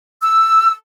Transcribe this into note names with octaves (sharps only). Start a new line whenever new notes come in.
E6